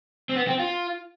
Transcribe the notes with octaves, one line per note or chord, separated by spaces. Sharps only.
C4
B3
C4
F4